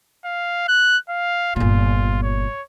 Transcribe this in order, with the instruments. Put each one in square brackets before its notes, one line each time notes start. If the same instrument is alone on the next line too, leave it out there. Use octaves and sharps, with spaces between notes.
[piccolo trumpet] F5
F#6
F5
[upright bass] G1 A#2 [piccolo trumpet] F4
[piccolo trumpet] C#5